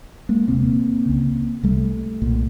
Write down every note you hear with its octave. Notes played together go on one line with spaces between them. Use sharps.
G#3 A#3
E1 D2 C3 A#3 C4
C#2 C#3
C2 C3 G3 A3
B1 A#2